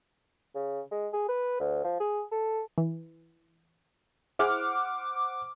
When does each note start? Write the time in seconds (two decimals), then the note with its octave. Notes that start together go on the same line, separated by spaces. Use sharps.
0.55 C#3
0.91 G#3
1.13 G#4
1.29 B4
1.60 D2
1.84 F3
2.00 G#4
2.32 A4
2.78 E3
4.39 E4 G#4 C5 F#5 D6 F6